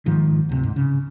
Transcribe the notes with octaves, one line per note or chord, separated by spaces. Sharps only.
G#2 D#3 F3
D2 C3
G#2
C#3